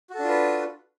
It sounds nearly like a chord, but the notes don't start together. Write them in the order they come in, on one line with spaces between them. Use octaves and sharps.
F#4 A4 D4 F4 B4